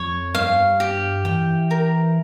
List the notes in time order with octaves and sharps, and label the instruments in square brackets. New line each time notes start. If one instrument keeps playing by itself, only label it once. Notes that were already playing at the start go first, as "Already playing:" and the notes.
Already playing: [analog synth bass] F2 [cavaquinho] C#5
[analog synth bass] G2 [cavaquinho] F5
[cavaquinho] G4
[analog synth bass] E3 [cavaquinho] G5
[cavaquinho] A#4